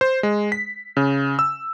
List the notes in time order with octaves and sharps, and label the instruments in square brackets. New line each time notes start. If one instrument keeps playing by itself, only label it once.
[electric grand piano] C5
G#3
B6
C#3
E6